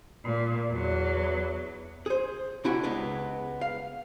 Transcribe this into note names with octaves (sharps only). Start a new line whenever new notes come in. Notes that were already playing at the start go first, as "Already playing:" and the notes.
A#2
E2 F#3
G#4 C5
C2 D4 E4 F#4 G4 G#5
C#2 G#3 B3
F5